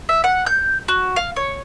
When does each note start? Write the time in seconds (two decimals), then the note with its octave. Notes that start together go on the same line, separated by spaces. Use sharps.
0.09 E5
0.24 F#5
0.46 G6
0.88 F#4
1.16 F5
1.36 C#5